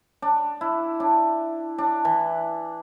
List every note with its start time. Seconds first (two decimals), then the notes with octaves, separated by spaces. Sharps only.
0.22 D4
0.61 E4
1.00 D4
1.78 D4
2.05 E3